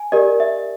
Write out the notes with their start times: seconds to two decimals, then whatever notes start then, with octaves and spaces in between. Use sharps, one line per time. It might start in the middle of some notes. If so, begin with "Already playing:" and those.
Already playing: G#5
0.12 G4 A#4 D5 D#5
0.40 E5